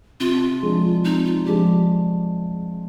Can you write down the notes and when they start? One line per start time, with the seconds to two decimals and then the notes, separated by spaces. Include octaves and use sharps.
0.20 C3 F4
0.62 F3 G#3 D4
1.04 C3 D#4
1.25 F4
1.46 F3 G#3 D4 G4